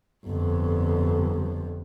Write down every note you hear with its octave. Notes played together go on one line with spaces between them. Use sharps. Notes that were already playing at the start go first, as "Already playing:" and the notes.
G1 F2